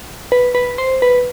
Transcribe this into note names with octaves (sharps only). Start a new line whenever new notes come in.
B4
B4
C5
B4